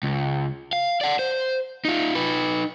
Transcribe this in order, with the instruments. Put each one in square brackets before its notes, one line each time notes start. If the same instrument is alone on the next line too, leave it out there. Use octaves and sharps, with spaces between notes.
[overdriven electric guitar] C#2
F5
D5 F#5
C5
D#4 F4
D#4 B4